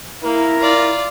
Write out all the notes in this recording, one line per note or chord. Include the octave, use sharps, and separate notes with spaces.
A#3 E4 A#4
F4 D5